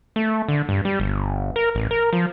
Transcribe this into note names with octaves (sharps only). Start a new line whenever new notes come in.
A3
D3
G2
G3
G1
A#4
A1
A#4
F3